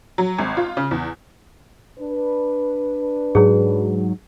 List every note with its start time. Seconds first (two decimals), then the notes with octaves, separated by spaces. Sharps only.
0.18 F#3
0.39 G#1
0.57 F4
0.77 C#3
0.91 E2
1.99 D4 B4
3.35 G#2 F#3 G#4